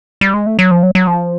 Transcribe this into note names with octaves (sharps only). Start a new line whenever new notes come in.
G3
G#3
A3
F#3
F3
F#3
F#3
F3